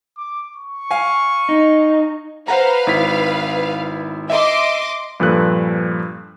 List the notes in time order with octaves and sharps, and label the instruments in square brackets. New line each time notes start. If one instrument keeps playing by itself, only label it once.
[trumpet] D6
C#6
[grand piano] F5 G#5
[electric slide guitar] D#4
[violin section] B4 F5 [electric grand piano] C5 F#5 A#5
[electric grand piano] G#1 E4 B6
[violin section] D#5 C6 D6 [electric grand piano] E5
[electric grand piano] G2 A#2 F3 A4 B4 F#6